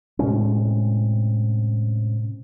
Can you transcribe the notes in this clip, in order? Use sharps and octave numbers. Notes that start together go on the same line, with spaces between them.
A2 C3 G#3 C#4